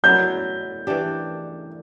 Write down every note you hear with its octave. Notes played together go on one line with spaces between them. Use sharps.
F#3 A3 E4 G6
E3 A3 D4 G4